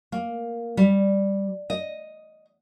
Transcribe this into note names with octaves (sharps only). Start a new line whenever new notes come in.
A#3
G3
D#5